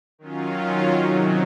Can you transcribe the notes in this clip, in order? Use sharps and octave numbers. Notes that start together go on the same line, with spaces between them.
D#3 F#3 C#4 F4
C3 D#3 F#3